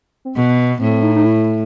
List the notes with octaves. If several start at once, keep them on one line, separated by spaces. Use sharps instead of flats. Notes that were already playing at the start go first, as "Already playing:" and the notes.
C4
B2 B3
A2 C4
D#4
D#4
E4